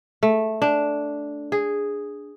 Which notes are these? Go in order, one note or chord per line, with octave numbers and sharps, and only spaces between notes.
A3
D4
G#4